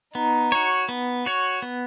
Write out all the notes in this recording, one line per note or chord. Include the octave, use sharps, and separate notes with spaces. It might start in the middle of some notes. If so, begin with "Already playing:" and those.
B3 D#4
F#4 C#5
B3
F#4 C#5
B3